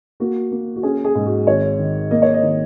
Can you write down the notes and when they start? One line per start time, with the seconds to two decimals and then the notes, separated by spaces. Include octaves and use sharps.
0.20 A#3 F#4
0.51 A#3
0.76 F#4
0.83 C#4 G#4
1.05 G#4
1.15 G#2
1.26 F#4
1.47 G#1 C#5
1.79 D#3
2.11 A#3 D#5
2.22 C#5
2.34 D#5
2.43 D#3